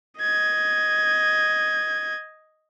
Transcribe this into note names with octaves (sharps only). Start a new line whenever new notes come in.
D#5 G#6